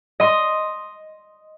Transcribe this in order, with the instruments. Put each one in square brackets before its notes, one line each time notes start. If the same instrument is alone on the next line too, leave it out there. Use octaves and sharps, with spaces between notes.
[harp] D#5 C6